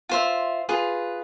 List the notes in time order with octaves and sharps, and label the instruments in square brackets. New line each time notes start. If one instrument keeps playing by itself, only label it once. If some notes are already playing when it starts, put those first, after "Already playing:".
[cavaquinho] F4 C5 E5
F4 G#4 B4